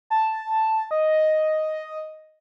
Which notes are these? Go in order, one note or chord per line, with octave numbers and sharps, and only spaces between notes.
A5
D#5